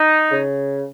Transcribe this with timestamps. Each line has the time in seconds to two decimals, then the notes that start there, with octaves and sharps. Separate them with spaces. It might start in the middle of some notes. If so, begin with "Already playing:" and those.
Already playing: D#4
0.31 C#3